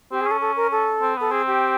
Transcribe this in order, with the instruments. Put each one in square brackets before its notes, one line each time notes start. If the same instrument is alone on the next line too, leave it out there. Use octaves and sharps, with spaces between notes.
[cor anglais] C4 [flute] G4
[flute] G#4
[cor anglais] C#4 [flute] A4
[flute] A4
A#4
A4
[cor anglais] C4
[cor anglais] B3 [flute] A4
[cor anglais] C4 [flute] G#4
[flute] G4